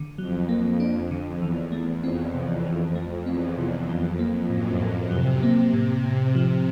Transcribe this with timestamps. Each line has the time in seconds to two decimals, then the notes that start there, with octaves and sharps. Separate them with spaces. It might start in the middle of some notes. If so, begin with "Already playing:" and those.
Already playing: D3
0.18 F2 F#3
0.49 A#3
0.80 D4
1.11 D3
1.42 E2 E3
1.72 A3
2.03 F2 C4
2.34 C3
2.65 E3
2.95 A3
3.26 E2 C4
3.57 C3
3.88 F2 F#3
4.19 A#3
4.50 F#2 A2
4.81 A2
5.11 C3 F#3
5.43 A#3
5.73 A2
6.04 A2
6.35 F3